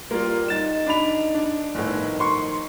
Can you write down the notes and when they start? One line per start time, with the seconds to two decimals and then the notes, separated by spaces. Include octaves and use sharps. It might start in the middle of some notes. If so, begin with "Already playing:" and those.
0.11 G3 A#3 F4
0.48 D#4 A6 E7
0.87 D4 B5 F7
1.35 D4
1.75 G1 A2 D#3 F3 D#4
2.20 C6 C#6